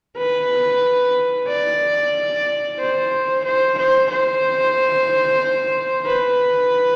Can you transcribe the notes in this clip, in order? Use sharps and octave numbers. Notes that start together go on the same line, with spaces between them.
B4
D5
C5
C5
C5
C5
B4